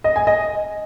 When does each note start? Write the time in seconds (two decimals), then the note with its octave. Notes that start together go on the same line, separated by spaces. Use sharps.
0.04 D#5
0.16 G#5
0.27 D#5